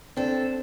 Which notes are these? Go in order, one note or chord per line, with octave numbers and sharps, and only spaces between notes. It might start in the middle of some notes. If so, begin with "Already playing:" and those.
C4 D4 A4